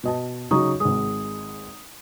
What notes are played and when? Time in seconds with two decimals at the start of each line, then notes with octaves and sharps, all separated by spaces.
0.04 B2 D#5 A5
0.51 C#3 F#3 D#4 A#5 C#6 D#6
0.80 G#1 G#3 D#6